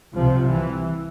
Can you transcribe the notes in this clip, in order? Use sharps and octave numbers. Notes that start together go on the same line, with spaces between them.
C2 C3 F3
E3